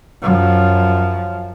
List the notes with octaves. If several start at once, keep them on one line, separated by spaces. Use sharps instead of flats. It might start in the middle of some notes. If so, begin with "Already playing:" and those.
F#2 F3